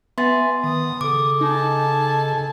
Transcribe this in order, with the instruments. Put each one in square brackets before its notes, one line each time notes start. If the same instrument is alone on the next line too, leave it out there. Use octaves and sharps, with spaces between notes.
[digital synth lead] B3 [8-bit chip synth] E5 G#5 [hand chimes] C6 A6
[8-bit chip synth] D#3 [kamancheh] D#6
[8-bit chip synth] C#3 A4 [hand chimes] D6
[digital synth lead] D#4 [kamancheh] G#5 A5